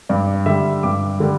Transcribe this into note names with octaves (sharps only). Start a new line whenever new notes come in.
G2 D5
D3 G3 E5
G2 D6
D3 G3